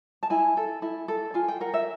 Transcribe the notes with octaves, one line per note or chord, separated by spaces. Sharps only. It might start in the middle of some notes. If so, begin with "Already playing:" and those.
A5
E4 G#5
A4
E4
A4
F4 G#5
G5
A#4 F#5
E5